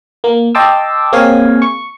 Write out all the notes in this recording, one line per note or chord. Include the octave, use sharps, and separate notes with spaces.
A#3
D#5 G5 A5 C6 D6 E6
A#3 C4 G#4 C#5 F5 G#5
C#6